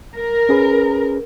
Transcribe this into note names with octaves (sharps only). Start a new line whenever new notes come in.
A#4
C#4 G#4 B4